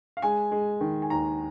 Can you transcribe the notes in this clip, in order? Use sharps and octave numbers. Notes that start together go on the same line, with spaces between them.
F5
G#3 G#5
G#3
D#3
G#5
D#2 A#5